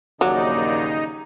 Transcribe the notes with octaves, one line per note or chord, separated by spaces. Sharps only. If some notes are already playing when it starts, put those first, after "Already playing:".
A#1 D#2 C#3 F#3 D#4 F#4 D5